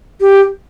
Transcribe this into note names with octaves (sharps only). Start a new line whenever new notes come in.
G4